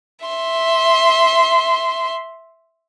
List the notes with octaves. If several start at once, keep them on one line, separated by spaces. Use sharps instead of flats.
E5 C6